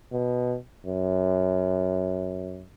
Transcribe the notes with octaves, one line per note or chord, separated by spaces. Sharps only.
B2
F#2